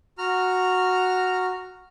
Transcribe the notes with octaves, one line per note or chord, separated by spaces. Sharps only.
F#4 A#5 F6